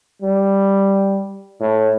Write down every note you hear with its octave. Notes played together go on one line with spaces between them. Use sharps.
G3
A2